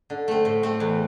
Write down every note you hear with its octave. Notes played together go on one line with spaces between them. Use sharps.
D3
A3 C4
A2
A3 C4
E2